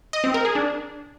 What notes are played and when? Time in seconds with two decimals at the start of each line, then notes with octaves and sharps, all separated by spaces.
0.13 D#5
0.24 C4
0.34 A#4
0.45 G#4
0.55 D4